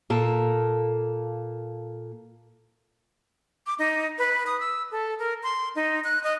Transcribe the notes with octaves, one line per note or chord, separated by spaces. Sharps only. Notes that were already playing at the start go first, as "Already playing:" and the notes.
A#2 A#3 A4
D6
D#4
B4
D#6
E6
A4
A#4
C6
D#4
F#6
D#5